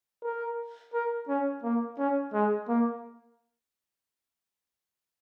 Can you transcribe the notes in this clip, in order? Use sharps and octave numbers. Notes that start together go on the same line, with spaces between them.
A#4
A#4
C#4
A#3
C#4
G#3
A#3